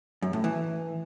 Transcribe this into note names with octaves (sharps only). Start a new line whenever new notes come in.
F#2
A2
E3